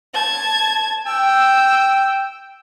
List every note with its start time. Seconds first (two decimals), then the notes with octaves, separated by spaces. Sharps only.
0.14 A5 G#6
1.07 G5 E6